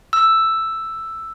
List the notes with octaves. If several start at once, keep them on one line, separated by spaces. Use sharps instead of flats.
E6